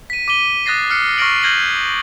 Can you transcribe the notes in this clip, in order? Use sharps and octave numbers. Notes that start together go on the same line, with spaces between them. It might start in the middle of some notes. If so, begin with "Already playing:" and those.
B6 D#7
D6 B6 D#7 G7
D#6 F#6 A6 A#6 C7
F6 F#6 C7 C#7
C#6 F6 A#6 C7 D7 F#7
F6 G6 G#6 A#6 F#7 G7